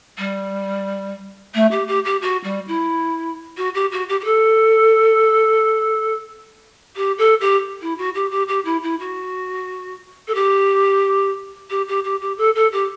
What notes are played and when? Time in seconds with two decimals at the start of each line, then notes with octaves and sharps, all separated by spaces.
0.18 G3
1.55 A3
1.71 G4
1.88 G4
2.05 G4
2.22 F#4
2.44 G3
2.68 E4
3.58 F#4
3.75 G4
3.92 F#4
4.09 G4
4.21 G4
4.25 A4
6.96 G4
7.18 A4
7.41 G4
7.82 E4
7.98 F#4
8.15 G4
8.31 G4
8.48 G4
8.65 E4
8.83 E4
9.00 F#4
10.28 A4
10.35 G4
11.70 G4
11.88 G4
12.04 G4
12.21 G4
12.38 A4
12.55 A4
12.72 G4